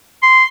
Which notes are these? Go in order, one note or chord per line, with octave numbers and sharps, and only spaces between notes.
C6